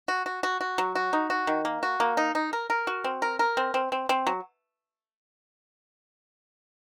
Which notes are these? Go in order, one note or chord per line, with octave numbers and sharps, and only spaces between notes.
F#4
F#4
F#4
F#4
F#3
F#4
D#4
F#4
D#3
A#3
F#4
A#3
D#4
D#4
A#4
A#4
F#4
C4
A#4
A#4
C4
C4
C4
C4
F#3